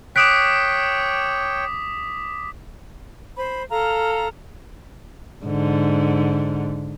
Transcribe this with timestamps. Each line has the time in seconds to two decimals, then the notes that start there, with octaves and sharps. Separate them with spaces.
0.16 C#5 G5 D6 D#6 F#6 B6 D7
3.37 C5 B5
3.70 A4 F5 A#5 F6
5.45 G#2 D3